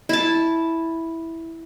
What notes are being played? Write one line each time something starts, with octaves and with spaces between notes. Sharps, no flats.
E4 A5